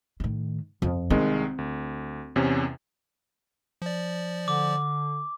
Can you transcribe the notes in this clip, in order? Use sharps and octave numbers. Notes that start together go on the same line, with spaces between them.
A2 D#3
F2
C2 D#3 G#3 C4
D2
E2 C3 C#4
F3 D5
D3 D6